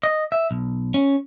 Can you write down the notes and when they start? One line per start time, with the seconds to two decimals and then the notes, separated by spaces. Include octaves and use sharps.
0.03 D#5
0.32 E5
0.51 B1
0.94 C#4